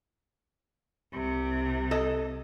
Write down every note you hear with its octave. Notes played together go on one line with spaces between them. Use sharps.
C2 C3
A4 D#5